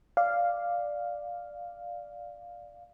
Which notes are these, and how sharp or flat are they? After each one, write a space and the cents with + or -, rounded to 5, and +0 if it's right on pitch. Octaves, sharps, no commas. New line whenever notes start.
D5 +5 F5 +0